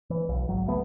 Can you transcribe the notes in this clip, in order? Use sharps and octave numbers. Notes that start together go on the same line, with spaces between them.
E3
B1
G#1 F#3
C#2 A3 B3